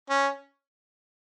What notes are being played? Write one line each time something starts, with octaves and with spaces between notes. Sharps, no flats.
C#4